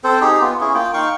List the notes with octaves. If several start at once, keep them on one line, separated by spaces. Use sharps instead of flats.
C4 A4 C5
D#4 G4 G#4
B3 F4
C#4 E4 G#4
A#3 F4 G5
D#4 F5 G5 C#6